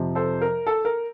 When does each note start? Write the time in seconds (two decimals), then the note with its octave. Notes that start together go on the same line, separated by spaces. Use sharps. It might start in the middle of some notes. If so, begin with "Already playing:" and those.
Already playing: F2 C3 F3
0.15 A4 C5
0.42 A#4
0.67 A4
0.85 A#4